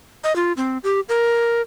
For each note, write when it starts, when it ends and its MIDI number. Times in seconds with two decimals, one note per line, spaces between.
0.24 0.35 75
0.36 0.52 65
0.57 0.78 60
0.84 1.00 67
1.09 1.62 70